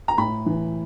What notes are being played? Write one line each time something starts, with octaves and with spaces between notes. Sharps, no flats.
A#5
A2 B5
E3